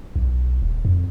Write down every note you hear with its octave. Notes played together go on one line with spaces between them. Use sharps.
B1
D#1
F2